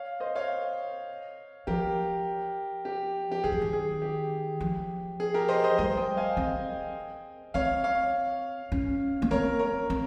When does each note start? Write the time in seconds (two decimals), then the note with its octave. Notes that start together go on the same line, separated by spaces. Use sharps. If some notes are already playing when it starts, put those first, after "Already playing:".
Already playing: C#5 F5
0.20 C5 D#5
0.36 C#5 F5
1.67 F3 G4 A#4
2.85 G4
3.32 G4
3.44 D#3 G#4
3.52 F3
3.62 D#3
3.73 G#4
4.02 G4
4.60 F3
5.20 G#4
5.34 G4 A#4
5.49 C5 D#5
5.64 C5 D#5
5.78 G3 C5 D#5
5.97 D#5 G5
6.17 F5 G#5
6.37 C4 D#5 G5
7.54 C4 C#5 F5
7.84 C#5 F5
8.72 C#4
9.22 A#3
9.31 C4 A#4 C#5
9.59 A#4 C#5
9.90 C4